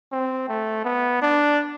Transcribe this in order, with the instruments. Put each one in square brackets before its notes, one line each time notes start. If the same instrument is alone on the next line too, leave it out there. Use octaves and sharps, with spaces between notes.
[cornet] C4
A3
B3
D4